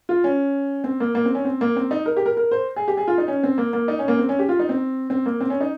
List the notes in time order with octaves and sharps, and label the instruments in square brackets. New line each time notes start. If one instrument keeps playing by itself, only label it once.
[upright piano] F4
C#4
C4
A#3
A#3
C4
C#4
C4
A#3
C4
D#4
A#4
G4
A#4
A#4
C5
G#4
G4
G#4
F4
D#4
C#4
C4
A#3
A#3
D#4
C#4
A#3
C4
C#4
G4
F4
D#4
C4
C4
A#3
C4
C#4
D#4